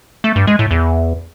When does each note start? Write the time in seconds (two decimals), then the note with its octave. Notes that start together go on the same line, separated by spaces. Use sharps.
0.24 A3
0.36 G2
0.47 G#3
0.59 A2
0.71 E2